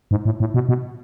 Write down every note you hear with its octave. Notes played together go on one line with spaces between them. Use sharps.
G#2
A2
A2
B2
B2